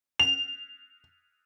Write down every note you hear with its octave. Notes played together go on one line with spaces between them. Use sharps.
F7